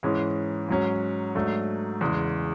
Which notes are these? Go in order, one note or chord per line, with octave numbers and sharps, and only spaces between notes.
G#2 E3 G#3 C#4
G#2 F#3 C#4
G#2 F#3 A3 D4
E2 C#3 G#3